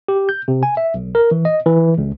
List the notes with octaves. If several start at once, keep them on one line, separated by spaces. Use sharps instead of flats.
G4
G6
C3
G#5
E5
B1
A#4
E3
D#5
E3
C#2